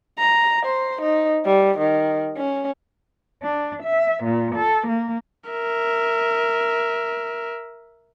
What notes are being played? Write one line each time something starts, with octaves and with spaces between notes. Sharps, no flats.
A#5
C5
D#4
G3
D#3
C#4
D4
E5
A#2
A4
A#3
A#4 E5